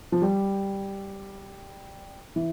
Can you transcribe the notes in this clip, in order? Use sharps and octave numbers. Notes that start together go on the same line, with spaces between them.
F3
G3
E3